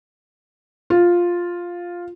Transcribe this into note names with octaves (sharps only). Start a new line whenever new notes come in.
F4